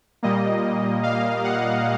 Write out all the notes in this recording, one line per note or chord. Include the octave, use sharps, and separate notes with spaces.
A#2 G3 A#3 D#5
F5
F#5